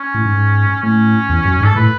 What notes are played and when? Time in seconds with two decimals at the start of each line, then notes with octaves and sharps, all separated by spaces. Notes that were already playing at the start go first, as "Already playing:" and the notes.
Already playing: C#4
0.14 A2
0.25 G#2
0.83 A2 C#4
1.30 E2
1.45 F#2
1.61 G#2 A4
1.76 A2 B4